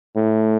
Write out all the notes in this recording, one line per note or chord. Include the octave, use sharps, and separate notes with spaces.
A2